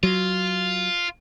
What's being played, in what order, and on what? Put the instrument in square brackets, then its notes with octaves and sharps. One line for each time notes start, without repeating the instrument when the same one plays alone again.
[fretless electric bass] F#3 [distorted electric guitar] F4